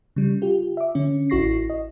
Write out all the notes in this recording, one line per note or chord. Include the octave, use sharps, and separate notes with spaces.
C#3 G3
F4 G4
E5 D6
D3 C#4
A1 E4 F#4 C#6 A#6 C7
D#5